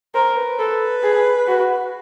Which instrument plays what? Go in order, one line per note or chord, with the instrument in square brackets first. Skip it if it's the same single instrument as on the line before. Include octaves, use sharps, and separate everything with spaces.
[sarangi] A#4 [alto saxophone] C5
[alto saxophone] B4
[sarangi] A4 [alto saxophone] B4
[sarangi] G#4
F#4